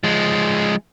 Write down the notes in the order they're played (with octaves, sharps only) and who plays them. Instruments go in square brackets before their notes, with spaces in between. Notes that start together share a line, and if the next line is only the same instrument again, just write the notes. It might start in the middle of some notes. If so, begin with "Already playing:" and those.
[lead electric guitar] F3 G#3